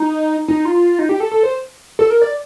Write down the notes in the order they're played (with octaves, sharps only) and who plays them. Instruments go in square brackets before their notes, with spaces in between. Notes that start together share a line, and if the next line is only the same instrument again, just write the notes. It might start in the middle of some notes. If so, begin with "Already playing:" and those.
Already playing: [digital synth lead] D#4
D#4
F4
D#4
G4
A4
A4
C5
A4
A#4
D5